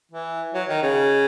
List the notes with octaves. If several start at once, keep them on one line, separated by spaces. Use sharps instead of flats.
E3
F#3
D#3
C#3